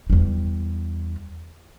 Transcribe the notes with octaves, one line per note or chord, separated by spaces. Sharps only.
E2 G3